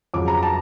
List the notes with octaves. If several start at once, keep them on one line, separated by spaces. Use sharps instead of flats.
F2 C#3 F#3 D6
A#5
A5